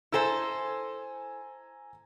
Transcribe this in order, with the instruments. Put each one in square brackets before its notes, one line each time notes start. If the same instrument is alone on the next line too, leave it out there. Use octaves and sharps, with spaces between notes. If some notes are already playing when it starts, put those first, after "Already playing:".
[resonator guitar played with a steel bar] E4 A4 C5 [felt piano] G#5 A#5 E6